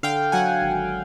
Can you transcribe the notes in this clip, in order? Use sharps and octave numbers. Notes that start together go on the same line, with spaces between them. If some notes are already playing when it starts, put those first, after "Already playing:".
D3 F5 G5
F#3 F#5 G#5
G#1